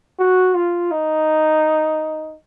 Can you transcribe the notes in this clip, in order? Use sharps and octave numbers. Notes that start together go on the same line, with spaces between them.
F#4
F4
D#4